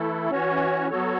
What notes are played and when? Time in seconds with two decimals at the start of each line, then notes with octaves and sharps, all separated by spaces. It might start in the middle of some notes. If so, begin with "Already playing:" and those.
Already playing: E3 A3 E4 A4
0.31 E3 C#4 F#4 C#5
0.90 F#3 B3 F#4 A4 C#5